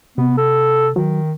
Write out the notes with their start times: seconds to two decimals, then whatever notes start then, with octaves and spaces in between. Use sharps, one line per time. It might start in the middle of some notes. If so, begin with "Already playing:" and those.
0.18 C3 B3
0.37 A4
0.96 D#3 F#3